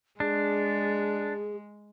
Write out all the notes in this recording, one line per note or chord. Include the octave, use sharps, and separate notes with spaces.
G#3 D4 G#4